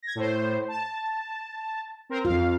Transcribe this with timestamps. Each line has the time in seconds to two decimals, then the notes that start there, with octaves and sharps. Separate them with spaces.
0.03 G#6 A#6
0.15 A2 C5
0.68 A5
2.09 C4 A#4 C5
2.25 F2 F4 F5